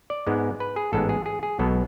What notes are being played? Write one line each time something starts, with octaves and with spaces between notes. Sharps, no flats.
D5
G#2 G#3 B3
B4
G#4
A1 G#2 G#3 B3 A4
G#4
G#4
G#4
B1 B2 G#3 B3 A4